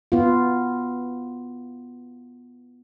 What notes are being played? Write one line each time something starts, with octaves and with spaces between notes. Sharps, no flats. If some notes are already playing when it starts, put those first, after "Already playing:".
B3 F4